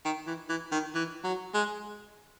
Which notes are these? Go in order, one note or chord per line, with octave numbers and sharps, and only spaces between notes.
D#3
E3
E3
D#3
E3
F#3
G#3